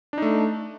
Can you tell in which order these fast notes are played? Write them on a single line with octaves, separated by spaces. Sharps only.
D4 D#4 A3